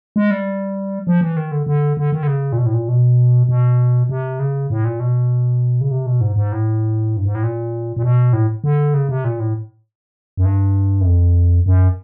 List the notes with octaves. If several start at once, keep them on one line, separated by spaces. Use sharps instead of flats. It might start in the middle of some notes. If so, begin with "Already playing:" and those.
G#3
G3
F3
E3
D#3
D3
D3
D3
D#3
D3
C#3
A#2
B2
A2
A#2
B2
B2
C3
C#3
A2
A#2
B2
C#3
C3
B2
G#2
G#2
A2
G2
G#2
A2
A#2
A#2
B2
A2
D3
C#3
C3
A#2
A2
F#2
G2
F#2
F2
F#2